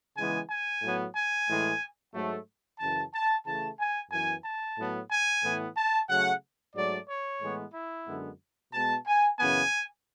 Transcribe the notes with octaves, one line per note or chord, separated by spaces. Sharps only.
C#3 E3 G#3 B3 G#5
G#5
A2 F#3 B3
G#5
A2 E3 G#3
G#2 F#3 A3
F#2 C#3 E3 A5
A5
C#3 E3 A3 A5
G#5
F#2 E3 B3 G#5
A5
A2 F#3 B3
G#5
A2 E3 B3
A5
C#3 F#3 A3 F#5
G#2 F#3 A3 D5
C#5
A2 E3 G#3 B3
E4
F#2 D3 G#3 B3
B2 G#3 B3 A5
G#5
F#2 C#3 E3 B3 G#5